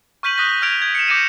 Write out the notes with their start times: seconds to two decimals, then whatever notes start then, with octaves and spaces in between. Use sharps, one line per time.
0.23 C#6 F6 G6 B6 D#7 F#7
0.38 D#6 F#6 G6 A#6 B6
0.62 F6 G#6 D7 F7
0.82 G#6
0.95 C#7 E7
1.07 D6 G6 A#6 C#7 D#7 E7